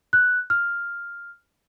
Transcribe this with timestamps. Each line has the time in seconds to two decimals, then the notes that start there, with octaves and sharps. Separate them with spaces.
0.13 F#6
0.50 F6